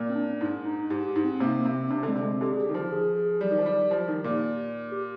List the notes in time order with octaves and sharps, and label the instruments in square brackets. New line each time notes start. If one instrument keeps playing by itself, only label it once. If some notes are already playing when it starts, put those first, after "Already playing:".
Already playing: [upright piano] A#2
[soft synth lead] C4
D4
[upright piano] G#2 [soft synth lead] D4
[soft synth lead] D#4
[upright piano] G#2 [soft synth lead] G4
[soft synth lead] G4
[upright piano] G#2
[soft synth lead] C4
[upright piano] C3 [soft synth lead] A#3
[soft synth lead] A#3
[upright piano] C3
[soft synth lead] C4
[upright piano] C3 [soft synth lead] D4
[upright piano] D3 [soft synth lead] G#3
[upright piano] C3
[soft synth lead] G#3
[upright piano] D3 [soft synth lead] G4
[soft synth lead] G#4
G4
[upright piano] D#3
F3
[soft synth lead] G#4
G#4
G#4
[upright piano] G3 [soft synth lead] G4
[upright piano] D#3
F3
G3
F3
D#3
A#2
[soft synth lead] G4